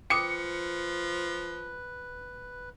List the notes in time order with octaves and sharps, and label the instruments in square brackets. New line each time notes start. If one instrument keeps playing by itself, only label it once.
[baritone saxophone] F3 [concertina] B4 [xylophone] G5 D6 D#6 [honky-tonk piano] C#7